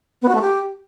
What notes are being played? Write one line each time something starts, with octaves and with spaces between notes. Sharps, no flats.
B3
F#4
A3
G4